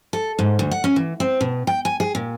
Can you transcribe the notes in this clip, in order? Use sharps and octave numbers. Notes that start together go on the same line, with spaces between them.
A4
G#2
D2
F#5
C#4
E3
C4
B2
G5
G#5
G#4
A#2